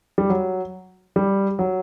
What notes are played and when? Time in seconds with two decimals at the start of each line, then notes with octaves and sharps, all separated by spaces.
0.18 G3
0.30 F#3
1.16 G3
1.59 F#3